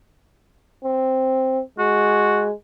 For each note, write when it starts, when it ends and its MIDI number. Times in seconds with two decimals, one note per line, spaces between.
0.84 1.61 60
1.79 2.52 56
1.79 2.47 66